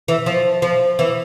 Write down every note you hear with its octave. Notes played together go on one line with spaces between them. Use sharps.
E3
F3
F3
E3